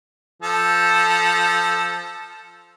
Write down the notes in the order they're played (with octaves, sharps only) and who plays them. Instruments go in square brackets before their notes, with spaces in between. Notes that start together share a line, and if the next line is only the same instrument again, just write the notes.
[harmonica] F3 A4